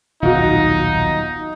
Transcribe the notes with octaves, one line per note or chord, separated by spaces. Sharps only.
D#1 B1 D#3 D#4 F4 F#4